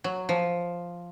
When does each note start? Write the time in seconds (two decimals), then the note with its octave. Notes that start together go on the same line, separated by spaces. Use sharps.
0.04 F#3
0.29 F3